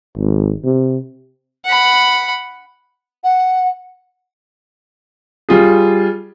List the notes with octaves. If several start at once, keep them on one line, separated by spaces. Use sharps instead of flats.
G#1
C3
F#5 B5
F#5
G3 F4 G#4